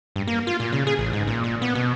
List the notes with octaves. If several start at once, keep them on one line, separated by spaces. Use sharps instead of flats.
G2
A#3
F4
A#2
C#3
G#4
A1
G#2
A#2
A#2
B3
B2